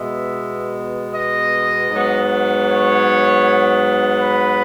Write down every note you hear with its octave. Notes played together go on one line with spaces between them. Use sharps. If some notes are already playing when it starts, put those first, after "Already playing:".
Already playing: B2 G#3 B3 E5
D#5
G#2 F#3 B3
C#5
B4